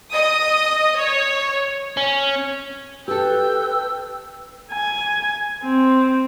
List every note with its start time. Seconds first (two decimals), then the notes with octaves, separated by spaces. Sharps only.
0.12 D#5 D#6
0.98 C#5
1.97 C#4
3.08 G4 A4 B4 G5 E6
4.72 G#5
5.64 C4